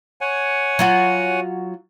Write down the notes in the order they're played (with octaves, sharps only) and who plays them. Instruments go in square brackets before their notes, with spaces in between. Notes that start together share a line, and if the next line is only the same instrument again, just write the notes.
[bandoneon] C#5 F#5 G#5
[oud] F#3 F4 F#4